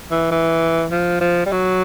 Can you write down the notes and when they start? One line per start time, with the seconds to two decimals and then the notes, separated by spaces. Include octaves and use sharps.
0.11 E3
0.31 E3
0.91 F3
1.21 F3
1.46 G3
1.52 F#3